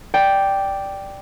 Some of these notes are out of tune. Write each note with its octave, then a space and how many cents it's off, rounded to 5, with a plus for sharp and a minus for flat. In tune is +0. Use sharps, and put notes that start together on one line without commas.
D5 +0 G5 +0